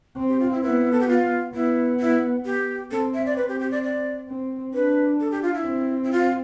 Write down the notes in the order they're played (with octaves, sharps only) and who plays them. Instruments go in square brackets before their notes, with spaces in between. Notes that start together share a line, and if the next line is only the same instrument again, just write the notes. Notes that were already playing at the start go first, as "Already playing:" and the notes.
[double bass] C4
[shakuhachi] G4
F4
E4
[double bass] B3 [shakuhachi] E4
[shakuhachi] A4
G4
F4
[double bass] B3 [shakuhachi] E4
[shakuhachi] E4
G4
[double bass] C4 [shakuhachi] A4
[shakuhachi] E5
D5
[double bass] C4 [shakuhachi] B4
[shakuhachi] G4
G4
D5
D5
[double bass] C4
[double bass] D4 [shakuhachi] B4
[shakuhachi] A4
G4
F4
E4
[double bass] C4
[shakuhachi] E4
F4